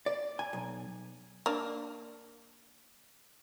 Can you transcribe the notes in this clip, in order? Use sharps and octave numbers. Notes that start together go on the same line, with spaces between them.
D5
G#5
B1
A#3 D4